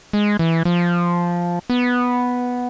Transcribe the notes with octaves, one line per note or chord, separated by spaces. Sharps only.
G#3
E3
F3
B3